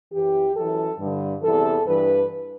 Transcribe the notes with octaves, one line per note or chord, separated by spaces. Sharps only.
F#2 E3 G4
F#2 E3 A4
G2 D3
E2 C3 E3 A4
G2 E3 B4